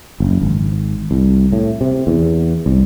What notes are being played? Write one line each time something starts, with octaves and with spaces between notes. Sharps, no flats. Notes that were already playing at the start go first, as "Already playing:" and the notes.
F#1
G#1
C2
A2
C3
E2
C2